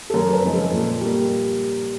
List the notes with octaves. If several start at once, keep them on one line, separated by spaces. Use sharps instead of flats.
A4
F#2 A#4
B4
C#3 F3 G#3
A4
A#2
G3 A#3